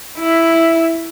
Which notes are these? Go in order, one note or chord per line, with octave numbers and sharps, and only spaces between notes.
E4